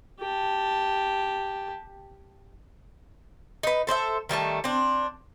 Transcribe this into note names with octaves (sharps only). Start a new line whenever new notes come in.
G4 A5
D#4 B4
A4 C5 D5 E5
D#3 G3 A3 A5
C4 D4